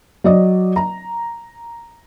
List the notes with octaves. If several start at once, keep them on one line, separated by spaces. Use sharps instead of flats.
F#3 D5 D#5
A#5